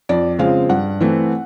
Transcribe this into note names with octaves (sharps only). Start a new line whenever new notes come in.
F2 D5
C#3 F3 G#3 C4 F5
G2 F#5
E3 A3 C4